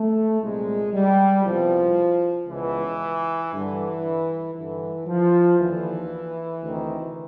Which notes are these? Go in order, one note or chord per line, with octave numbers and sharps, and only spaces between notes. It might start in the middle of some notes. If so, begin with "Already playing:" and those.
Already playing: A3
C2 A#2 G#3
G3
C2 B2 F3
C#2 B2 E3
G2 D3 E3
G2 D3 E3
F3
D#2 D3 E3
D2 C3 D#3